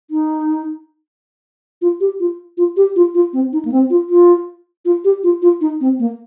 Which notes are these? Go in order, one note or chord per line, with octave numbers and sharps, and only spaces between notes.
D#4
F4
G4
F4
F4
G4
F4
F4
C4
D#4
A#3
C4
F4
F4
F4
G4
F4
F4
D#4
C4
A#3